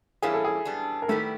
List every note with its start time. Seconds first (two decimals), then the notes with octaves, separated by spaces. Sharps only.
0.22 E3 G3 A#3 C#4 E4 G#4
0.34 A4
0.44 G#4
0.65 G3 B3 D4
1.02 A#4
1.08 D#3 G3 A3 B3 E4 G4 A4